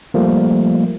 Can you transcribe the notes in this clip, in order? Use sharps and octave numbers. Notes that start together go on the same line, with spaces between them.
F3 G3 A3 A#3